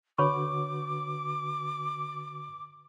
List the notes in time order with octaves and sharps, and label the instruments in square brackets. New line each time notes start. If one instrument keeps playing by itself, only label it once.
[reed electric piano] D3 F#4 B4 [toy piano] C#5 B5 C#6 [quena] D6